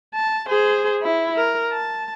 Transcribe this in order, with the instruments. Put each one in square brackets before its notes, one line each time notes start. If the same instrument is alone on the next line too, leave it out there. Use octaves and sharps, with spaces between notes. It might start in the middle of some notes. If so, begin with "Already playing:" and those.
[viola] A5
G#4 C5
E4
A#4
A5